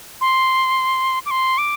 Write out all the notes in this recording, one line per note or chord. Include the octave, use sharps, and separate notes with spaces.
C6
D6
C6
D6